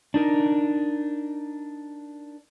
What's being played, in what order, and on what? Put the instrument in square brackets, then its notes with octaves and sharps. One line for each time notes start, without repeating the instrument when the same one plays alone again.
[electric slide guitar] D4 D#4 A#4